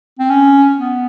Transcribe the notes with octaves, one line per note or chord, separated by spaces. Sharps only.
C4
C#4
B3